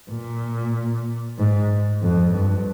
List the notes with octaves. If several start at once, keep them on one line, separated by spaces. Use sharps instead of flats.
A#2
G#2
F2
G2